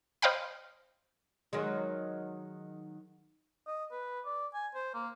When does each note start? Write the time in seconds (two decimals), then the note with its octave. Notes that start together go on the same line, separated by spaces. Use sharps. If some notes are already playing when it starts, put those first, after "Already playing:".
0.22 C5 D#5 F5 G5 B5
1.53 D#3 F#3 G#3
3.67 D#5
3.92 B4
4.25 D5
4.54 G#5
4.74 C5
4.94 A#3